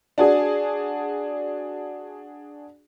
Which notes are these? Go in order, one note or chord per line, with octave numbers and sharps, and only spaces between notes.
D4 F#4 G#4